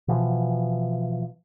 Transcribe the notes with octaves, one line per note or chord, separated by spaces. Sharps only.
B2 E3 F3